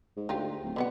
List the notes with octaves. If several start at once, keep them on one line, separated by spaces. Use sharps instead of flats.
G#2
D2 D#4 F4 G4
D1
B2 D3 B3 F#5